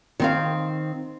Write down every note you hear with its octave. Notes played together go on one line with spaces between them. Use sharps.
D#3 C4 F5